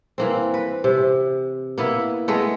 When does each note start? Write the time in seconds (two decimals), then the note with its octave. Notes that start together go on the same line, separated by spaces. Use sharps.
0.18 E3 A#3 C4
0.54 B4
0.84 C3
1.78 A#3 B3 E4
2.28 G#3 A3 B3